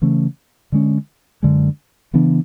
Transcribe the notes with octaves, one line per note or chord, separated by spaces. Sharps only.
C#3 E3 A3 C#4
D3 G#3 C#4
F#2 D3 G#3
C#3 E3 B3 D4